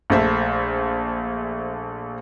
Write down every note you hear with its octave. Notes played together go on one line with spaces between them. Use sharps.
A#1 A3 C5 E5